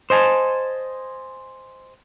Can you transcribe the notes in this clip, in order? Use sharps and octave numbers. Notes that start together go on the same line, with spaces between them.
C5 D#5 G#5 A5